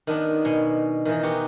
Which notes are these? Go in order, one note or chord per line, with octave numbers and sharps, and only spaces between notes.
D#3 B3 D4
B2 G#5
D#3 E3 D#4
B3 D#4 F#4 G4